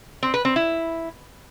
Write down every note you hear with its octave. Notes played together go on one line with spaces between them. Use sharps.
C4
B4
C4
E4